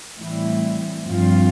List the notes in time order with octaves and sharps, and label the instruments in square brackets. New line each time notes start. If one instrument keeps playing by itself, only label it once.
[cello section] A2 E3 G3 C4 E4
G2 F3 C4 F4